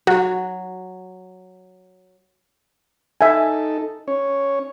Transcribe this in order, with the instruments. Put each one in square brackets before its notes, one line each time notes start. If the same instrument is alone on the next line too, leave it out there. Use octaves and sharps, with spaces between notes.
[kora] F#3 [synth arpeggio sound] F#4
[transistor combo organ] D#4 A4 [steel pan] E5 G#5
[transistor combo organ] C#4 C#5